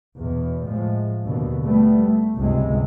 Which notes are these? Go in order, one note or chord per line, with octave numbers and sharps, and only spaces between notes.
E2 B2
A2 F3 G#3
D#2 B2 D3
G3 A3 B3
A3
G1 C#2 C3 G#3